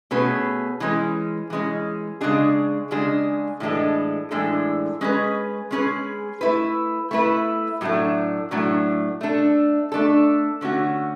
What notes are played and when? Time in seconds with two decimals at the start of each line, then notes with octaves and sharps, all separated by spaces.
0.11 B2 A3 C#4 G#4 B4
0.80 E3 G#3 C#4
1.50 E3 G#3 C#4
2.21 C#3 G#3 D4 G#4
2.91 C#3 G#3 D4 G#4
3.60 A2 E3 G#3 D4 A4
4.31 A2 E3 G#3 D4 A4
5.01 G#3 C#4 G#4 B4
5.71 G#3 C#4 G#4 B4
6.41 A3 E4 B4
7.11 A3 E4 B4
7.81 A2 F#3 A3 D4
8.51 A2 F#3 A3 D4
9.21 A3 D4 A4
9.92 A3 D4 A4
10.61 D3 A3 C#4 F#4